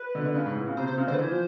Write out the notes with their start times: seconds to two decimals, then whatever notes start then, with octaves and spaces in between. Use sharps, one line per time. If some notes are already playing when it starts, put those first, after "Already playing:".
Already playing: B4
0.15 D3
0.25 D3
0.35 C#3
0.46 G#2
0.55 A2
0.67 C#3
0.77 C3 C5
0.87 C3 C5
0.97 C#3
1.07 D3 C5
1.14 B4
1.19 E3 C5
1.29 F3